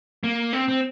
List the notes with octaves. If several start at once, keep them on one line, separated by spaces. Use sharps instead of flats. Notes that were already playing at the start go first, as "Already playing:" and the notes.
A#3
C4
C4